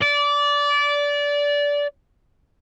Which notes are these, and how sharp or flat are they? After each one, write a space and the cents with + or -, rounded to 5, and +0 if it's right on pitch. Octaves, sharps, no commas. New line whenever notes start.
D5 -20